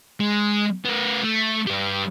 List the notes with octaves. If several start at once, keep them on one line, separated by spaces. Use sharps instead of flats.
G#3
B3 A#4
A3
G2 G4